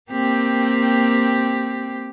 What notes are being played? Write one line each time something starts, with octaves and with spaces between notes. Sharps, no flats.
A#3 C4 G4